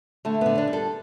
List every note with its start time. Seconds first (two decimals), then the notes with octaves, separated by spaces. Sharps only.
0.25 D3 A3
0.41 D3 B3
0.58 D4
0.67 G3
0.73 A4